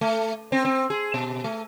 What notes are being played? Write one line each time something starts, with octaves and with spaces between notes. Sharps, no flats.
A3
C4
C4
G#4
B2
A3